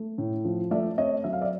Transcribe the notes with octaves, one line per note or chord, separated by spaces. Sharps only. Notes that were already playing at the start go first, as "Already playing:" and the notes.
Already playing: A3
A2
F3
A3 D5 E5
C4 C#5 D#5
F#3 E5
F5
D5 E5